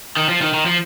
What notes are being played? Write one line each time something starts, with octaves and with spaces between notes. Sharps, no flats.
D#3
F3
D#3
D#3
F3